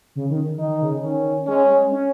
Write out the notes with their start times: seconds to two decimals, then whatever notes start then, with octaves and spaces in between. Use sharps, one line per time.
0.16 C#3
0.30 D#3
0.58 D#3 D#4
0.81 C#3
1.03 D#3 C#4
1.47 G#3 C#4
1.69 G#3
1.92 C#4